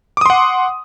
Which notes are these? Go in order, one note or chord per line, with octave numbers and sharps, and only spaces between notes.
F#5 C6 D6 D#6